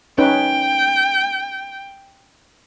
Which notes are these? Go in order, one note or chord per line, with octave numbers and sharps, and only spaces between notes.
C#4 D#4 B4 G5